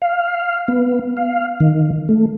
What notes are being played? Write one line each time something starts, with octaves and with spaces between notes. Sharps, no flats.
F5
B3
F5
D#3
A3